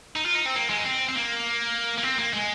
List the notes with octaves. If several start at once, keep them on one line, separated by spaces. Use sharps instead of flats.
D#4
F4
D#4
C4
A#3
G#3
D#4
C4
C4
A#3
A#3
C4
A#3
G#3